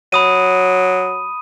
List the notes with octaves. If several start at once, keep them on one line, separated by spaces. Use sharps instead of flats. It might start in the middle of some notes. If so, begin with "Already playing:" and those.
F#3 B5 D#6 D#7